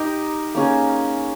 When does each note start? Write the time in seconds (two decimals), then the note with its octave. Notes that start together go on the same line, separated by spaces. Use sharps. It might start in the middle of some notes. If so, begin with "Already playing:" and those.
Already playing: D#4 G4 A#4 D#5
0.55 A#3 C#4 G#4